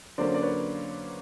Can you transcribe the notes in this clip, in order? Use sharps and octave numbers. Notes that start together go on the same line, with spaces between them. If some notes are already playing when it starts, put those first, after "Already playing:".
D3 F#3 A#3 C#4 C5 D5
D5
B4 C#5